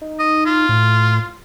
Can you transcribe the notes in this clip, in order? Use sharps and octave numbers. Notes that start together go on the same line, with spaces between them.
D#4
D#5
F4
A2